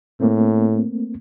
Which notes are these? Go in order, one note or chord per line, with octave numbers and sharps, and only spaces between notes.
A2 A3 A#3 C4